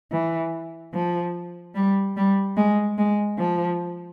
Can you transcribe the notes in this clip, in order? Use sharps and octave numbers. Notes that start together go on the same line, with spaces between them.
E3
F3
G3
G3
G#3
G#3
F3